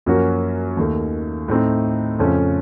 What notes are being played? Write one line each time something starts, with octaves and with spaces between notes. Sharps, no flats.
F#2 F3 A#3 C#4 F#4
D#2 D#3 A3
A2 A3 C4 D#4
F2 C#3 F3 A3 C#4